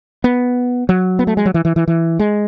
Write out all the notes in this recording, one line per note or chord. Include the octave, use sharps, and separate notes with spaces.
B3
F#3
B3
A3
G#3
F#3
E3
E3
E3
E3
G#3